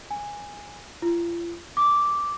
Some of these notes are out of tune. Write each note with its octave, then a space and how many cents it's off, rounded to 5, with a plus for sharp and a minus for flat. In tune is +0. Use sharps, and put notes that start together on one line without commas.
G#5 -10
F4 -40
D6 -5